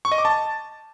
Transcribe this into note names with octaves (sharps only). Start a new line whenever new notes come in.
C#6
D#5
D6
A5